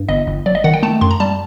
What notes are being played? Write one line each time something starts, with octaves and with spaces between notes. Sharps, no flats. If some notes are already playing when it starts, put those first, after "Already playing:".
Already playing: G2
G1 D#5
G1
F#3 D5
D#5
D#3 F#5
G5
A3 A5
F#2 C6
A#5
G3 A5